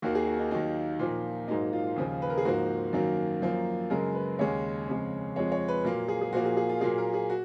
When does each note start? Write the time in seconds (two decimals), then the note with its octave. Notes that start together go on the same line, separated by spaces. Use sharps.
0.02 D#2 D#3 A#3 F#4
0.15 G#4
0.27 F#4
0.39 D#4
0.51 D#2 D#3 F#3 A#3 D#4
0.99 A#2 F3 A#3
1.48 G#2 F#3 A#3 D#4
1.73 F4
1.96 D#2 C#3 F3
2.22 B4
2.30 A#4
2.37 G#4
2.45 G#2 F3 A#3 F#4
2.93 F#2 D#3 F#3 A#3
3.42 F#2 F3 A#3
3.90 F#2 C#3 G#3 A#4
4.15 B4
4.39 D#2 C#3 G#3 C#5
4.88 F2 C#3 G#3
5.36 F2 F3 G#3 C#5
5.52 C#5
5.68 B4
5.84 A#2 F#3 A#3 A#4
6.08 G#4
6.21 G#4
6.33 A#2 F3 A#3 F#4
6.45 G#4
6.57 G#4
6.69 F4
6.81 A#2 F#3 A#3 G#4
6.98 A#4
7.14 G#4
7.30 F#4